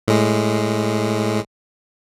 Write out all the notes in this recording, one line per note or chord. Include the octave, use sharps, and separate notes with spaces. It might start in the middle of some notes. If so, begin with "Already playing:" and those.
A2 G#3